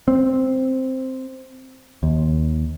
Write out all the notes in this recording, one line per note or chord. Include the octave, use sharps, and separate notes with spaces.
C4
D#2